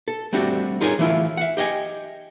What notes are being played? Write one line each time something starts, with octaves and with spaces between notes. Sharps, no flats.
A4
G3 A3 C4 D4 F#4
D#4 F4 G#4 A#4 C#5 G#5
E3 A3 E4 F4
E5 F#5
G4 D#5 G5 G#5